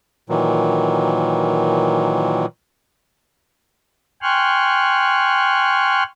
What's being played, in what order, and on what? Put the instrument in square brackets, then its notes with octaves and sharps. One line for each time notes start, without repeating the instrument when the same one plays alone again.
[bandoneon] A#2 D#3 E3 F#3
[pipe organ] G5 G#5 C6 C#6 F6 F#6